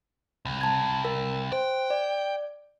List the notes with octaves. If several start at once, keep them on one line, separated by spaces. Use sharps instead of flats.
C2
A5 G#6
A#4
C5 G5
D5